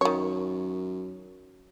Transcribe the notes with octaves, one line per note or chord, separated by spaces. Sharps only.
F#2 D#3 C#5